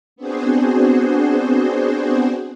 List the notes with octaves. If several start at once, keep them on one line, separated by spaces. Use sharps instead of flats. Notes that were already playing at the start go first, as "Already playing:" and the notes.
B3 C4 D4 F#4 G#4 C5